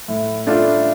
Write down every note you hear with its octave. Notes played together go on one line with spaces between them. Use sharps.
A2
A3 D4 F4